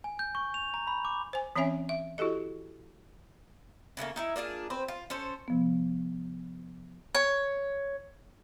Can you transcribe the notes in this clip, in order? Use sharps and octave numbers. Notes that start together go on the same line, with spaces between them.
G#5
G6
C#6
F7
A#5
B5
D6
C5 G#5
E3 C4 C#4 C#5 E5 G#5
E5
E4 F#4 G4 A4 D#5
C#3 E3 A3 A#3
D#4 E4 E5
A#3 D4 F4 G#4
C4 B4 C5
F4
C#4 A4 C5
C3 F3 B3
C#5